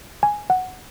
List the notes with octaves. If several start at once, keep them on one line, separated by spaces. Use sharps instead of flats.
G#5
F#5